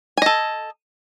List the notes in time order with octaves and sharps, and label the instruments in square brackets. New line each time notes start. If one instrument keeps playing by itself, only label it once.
[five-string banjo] G#5
D#5
A4